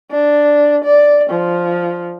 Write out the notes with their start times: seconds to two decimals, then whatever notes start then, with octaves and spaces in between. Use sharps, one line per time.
0.11 D4
0.84 D5
1.30 F3